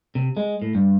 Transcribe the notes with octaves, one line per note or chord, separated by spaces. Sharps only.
C3
G#3
A2
G2